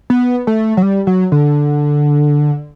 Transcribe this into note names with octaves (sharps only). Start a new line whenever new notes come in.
B3
A3
F#3
G3
F#3
D3